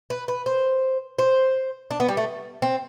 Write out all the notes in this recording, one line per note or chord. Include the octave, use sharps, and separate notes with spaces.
B4
B4
C5
C5
D4
B3
G3
A3
C4